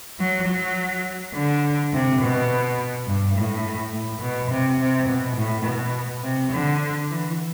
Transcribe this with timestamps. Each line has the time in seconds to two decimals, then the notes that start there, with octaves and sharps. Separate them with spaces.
0.20 F#3
0.49 F#3
1.35 D3
1.93 C3
2.21 B2
3.08 G2
3.37 A2
3.93 A2
4.21 B2
4.51 C3
4.80 C3
5.09 B2
5.36 A2
5.65 B2
6.23 C3
6.52 D3
7.10 E3